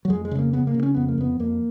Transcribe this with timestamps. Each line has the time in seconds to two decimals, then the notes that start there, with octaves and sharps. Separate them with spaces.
0.05 F#3
0.10 F2 G#3
0.25 G#3
0.31 C#3
0.39 A#3
0.53 C#3 B3
0.67 A#3
0.74 C#3
0.83 C#4
0.94 F2 B3
1.09 A#3
1.18 F2 B3
1.40 F2 A#3